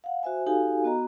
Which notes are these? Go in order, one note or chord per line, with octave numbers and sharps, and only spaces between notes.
F5 F#5
F#4 C5 E5 G#5
D#4 F#4 G4 A4 F5 G#5
B3 F#4 D#5 A#5